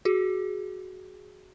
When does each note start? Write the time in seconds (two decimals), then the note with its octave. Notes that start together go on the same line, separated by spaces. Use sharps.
0.05 F#4 G#4